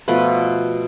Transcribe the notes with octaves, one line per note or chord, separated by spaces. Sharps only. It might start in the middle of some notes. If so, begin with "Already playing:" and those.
B2 F3 A3 B4